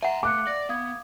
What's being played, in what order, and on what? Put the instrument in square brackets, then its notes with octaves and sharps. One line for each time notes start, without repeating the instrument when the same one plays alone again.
[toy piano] E5 F#5 [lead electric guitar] G#5 A#5
[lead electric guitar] A3 [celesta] F5 F#6 C#7 [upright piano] D6
[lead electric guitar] D5 [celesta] A#6
[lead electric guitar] B3 [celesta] F5 D#6 G#6